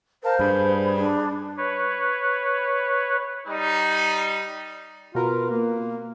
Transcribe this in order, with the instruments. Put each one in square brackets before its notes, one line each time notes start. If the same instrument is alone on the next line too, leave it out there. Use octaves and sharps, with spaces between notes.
[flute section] A#4 F5 A5 [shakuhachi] C5
[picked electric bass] G2 [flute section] G#4 B5
[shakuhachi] D4
[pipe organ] B4 C#5
[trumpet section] G3 D#4
[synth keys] B2 A#4 B4 [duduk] F4
[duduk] A#3